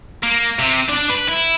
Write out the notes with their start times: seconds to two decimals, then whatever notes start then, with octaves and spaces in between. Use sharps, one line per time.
0.23 A#3
0.59 C3
0.89 D4 D5
1.10 B4
1.29 E4